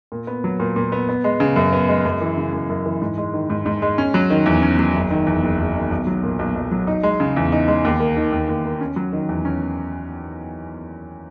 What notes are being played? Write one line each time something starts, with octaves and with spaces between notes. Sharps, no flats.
A#2
B3
F#3
A#2
A#2
B3
B3
G#3
C#3
F#2
B3
G#3
F#2
E3
C#3
F#2
F#2
E3
G#2
G#3
D#3
G#2
G#2
G#3
C#4
F#3
D#3
E2
C#4
F#3
F#1
D#3
E2
F#1
F#1
D#3
B1
F#3
A#2
B1
B1
F#3
D#4
G#3
C#3
E2
D#4
G#3
D#2
A#3
D#3
D#2
D#2
A#3
C#4
F#3
D#3
E2
C#4